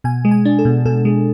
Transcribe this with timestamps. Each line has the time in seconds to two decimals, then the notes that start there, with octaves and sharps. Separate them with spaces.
0.04 B2 G#5
0.25 G#3
0.31 G#5
0.45 D4
0.59 A4
0.65 B2
0.85 B2 A4
1.05 G#3